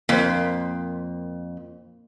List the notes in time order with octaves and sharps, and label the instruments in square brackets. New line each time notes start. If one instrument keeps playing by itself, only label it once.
[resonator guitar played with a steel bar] F2 [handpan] A#3 C5